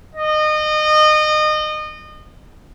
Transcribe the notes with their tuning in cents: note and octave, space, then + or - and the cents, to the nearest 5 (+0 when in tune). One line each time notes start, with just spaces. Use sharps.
D#5 -30